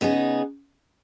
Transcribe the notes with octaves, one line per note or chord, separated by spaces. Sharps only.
C#3 B3 D#4 G#4